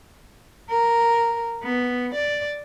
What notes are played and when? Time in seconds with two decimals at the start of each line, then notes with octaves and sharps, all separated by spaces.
0.70 A#4
1.64 B3
2.14 D5